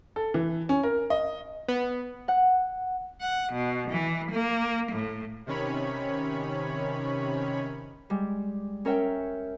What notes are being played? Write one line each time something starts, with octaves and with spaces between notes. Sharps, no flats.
A4
E3
C#4
A#4
D#5
B3
F#5
F#5
B2
E3
A#3
A2
C3 D#3 C#4 C#5 B5
G3 G#3
C#4 A#4 C#5 E5 G5